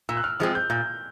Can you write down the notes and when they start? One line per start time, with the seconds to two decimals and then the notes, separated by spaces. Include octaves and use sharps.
0.09 A#2 E6
0.17 F#6
0.24 F6
0.40 F3 G#3 C4 F6
0.55 G6
0.70 A#2 G6